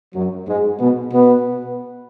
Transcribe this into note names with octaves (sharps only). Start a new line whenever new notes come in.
F#2 F#3
G#2 G#3
B2 B3
B2 B3